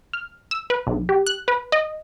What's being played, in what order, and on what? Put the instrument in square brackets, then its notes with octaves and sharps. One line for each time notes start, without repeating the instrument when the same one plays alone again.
[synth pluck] F6
E6
B4
B1
G4
F#6
B4
D#5